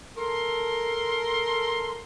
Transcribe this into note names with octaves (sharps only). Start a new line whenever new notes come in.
A4 A#4 C6